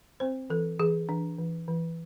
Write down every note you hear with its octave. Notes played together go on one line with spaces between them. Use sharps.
C4 C5
E3 A4
E3 G#4
E3 D4
E3
E3